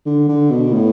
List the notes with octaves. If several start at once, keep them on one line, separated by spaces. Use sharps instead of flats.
D3
D3
B2
A2